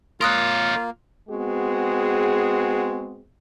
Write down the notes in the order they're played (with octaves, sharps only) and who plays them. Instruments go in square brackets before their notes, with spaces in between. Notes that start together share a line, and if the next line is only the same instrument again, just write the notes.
[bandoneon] A#3 [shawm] F4 [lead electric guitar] A#4 C#5 [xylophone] C6 D#6 F#6
[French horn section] G#3 B3 C4 F#4 G#4